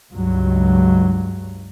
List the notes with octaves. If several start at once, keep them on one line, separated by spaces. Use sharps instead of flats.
C#2 G2 F#3